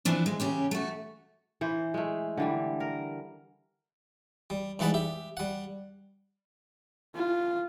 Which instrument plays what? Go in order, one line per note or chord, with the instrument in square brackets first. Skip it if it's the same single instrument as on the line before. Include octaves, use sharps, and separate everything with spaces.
[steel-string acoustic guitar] E3 F3 D4
G#3
C#3 C#4 G4
A3 F#4
[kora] E3 C5
G#3 A3
D3 E3 G3
A#4
[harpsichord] G3
G#2 E3 G3 F#5 A5 B5
G4 E5
G3 F#5
[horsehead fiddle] F4